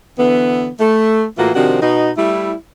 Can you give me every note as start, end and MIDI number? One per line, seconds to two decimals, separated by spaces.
0.18 0.69 50
0.18 0.69 52
0.18 0.69 59
0.79 1.23 57
1.37 1.50 45
1.37 1.50 52
1.37 1.50 58
1.37 1.50 65
1.37 1.50 66
1.55 1.77 48
1.55 1.77 51
1.55 1.77 53
1.55 1.77 62
1.55 1.77 66
1.81 2.10 47
1.81 2.10 63
2.16 2.53 55
2.16 2.53 57
2.16 2.53 64